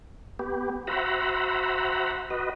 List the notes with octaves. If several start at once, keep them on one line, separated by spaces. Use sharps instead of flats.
B3 G4
F#4 C5 E5 F#5 A#5 B5
F#4 B4 D#5